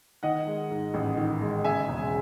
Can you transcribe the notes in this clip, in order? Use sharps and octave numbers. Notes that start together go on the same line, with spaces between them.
D#3 D#5 F#5
G#3
G#2
A1
D#3
G#3
C#3 E5 G#5
E1